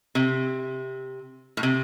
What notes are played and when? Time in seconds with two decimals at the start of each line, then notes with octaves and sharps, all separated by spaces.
0.15 C3
1.57 A2
1.63 C3